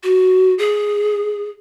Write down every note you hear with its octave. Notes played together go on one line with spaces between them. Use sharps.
F#4
G#4